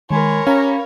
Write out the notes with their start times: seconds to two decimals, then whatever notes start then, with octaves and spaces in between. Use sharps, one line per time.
0.10 D#3 G#3 A#4 C#5 G#5 B5 C6
0.47 C#4 G4 F5 A#5 B5